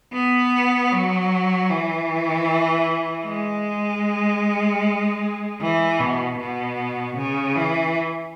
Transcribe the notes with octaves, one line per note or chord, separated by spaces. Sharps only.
B3
F#3
E3
G#3
E3
B2
B2
C#3
E3